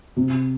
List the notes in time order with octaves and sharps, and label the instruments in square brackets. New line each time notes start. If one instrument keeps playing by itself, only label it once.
[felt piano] C3